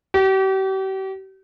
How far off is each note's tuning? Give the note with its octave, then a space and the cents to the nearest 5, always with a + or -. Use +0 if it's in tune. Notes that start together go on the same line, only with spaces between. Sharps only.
G4 -40